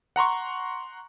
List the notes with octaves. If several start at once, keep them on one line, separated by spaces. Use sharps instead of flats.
F#5 A#5 C6 C#6